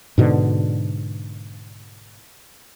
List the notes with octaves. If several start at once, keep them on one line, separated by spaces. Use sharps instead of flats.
G#2 B2 D3